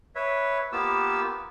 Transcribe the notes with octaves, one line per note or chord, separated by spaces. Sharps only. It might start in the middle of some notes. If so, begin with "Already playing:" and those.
B4 C#5 E5
A#3 B3 F4 G4 E6